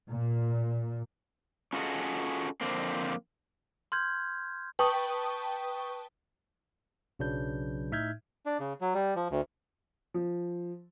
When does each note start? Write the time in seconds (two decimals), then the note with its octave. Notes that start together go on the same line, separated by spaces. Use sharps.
0.10 A#2
1.73 C#4 F4 F#4 G#4 A4 D#5
2.61 F2 D3 A#3 C4
3.92 C6 F6 G6 G#6
4.79 B4 G5 A5 C#6 D#6
7.19 B1 C#3 F#3 D4 B4 G6
7.91 A2 D#4 E5 F6 G6 G#6
8.46 D4
8.60 C#3
8.81 F#3
8.94 G3
9.16 F3
9.31 D2
10.14 F3